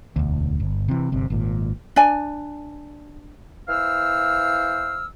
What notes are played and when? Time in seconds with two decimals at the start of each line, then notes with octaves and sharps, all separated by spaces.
0.16 E1 D2
0.60 G1
0.88 C3 E3
1.12 G1 C3
1.30 G#1 A#2
1.96 D4 D5 G#5
3.68 E3 C5 F5 E6 F6